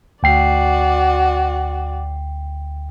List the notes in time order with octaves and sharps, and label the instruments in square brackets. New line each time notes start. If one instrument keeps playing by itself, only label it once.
[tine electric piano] D2 G5 C7 [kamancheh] F#4 D5